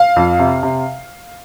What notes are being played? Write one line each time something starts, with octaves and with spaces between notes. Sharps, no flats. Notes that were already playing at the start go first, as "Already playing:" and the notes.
Already playing: F5
F2
C3
C3